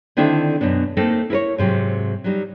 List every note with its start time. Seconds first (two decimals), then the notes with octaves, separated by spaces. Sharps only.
0.17 D3 D#3 C4 D4 E4 A4
0.61 F#2 B2 B3 D4
0.97 A3 A#3 C4 D#4 A4
1.30 E4 A#4 B4 C#5
1.58 G#2 C3 D#3 F#3
2.24 F#3 G3 D#4